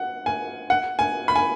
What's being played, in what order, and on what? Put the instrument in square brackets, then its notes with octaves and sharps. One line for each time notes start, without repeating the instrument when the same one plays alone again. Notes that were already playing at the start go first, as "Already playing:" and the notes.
Already playing: [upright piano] F#5
G#5
F#5
G#5
B5
G#5